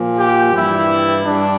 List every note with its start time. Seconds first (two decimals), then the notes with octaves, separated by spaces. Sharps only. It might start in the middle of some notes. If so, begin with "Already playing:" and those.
Already playing: A#2 F3
0.18 G4
0.53 G2 E3 G3 E4
1.24 G2 D4